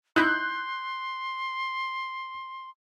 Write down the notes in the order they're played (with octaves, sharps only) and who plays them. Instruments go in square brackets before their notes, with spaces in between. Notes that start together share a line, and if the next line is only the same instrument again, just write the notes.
[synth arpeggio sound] D#4 E4 [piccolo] C6 [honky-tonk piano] F#6 G6